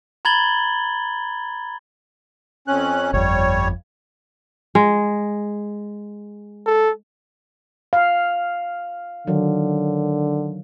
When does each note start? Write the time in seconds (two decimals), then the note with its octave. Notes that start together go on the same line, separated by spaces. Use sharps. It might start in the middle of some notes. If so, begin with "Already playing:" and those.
0.25 A#5 B5 G#6 A6 F#7 G7
2.68 F2 C#4 F#6
3.13 G1 F2 G3 C#5
4.75 G#3
6.66 A4
7.93 F5
9.27 D3 D#3 F#3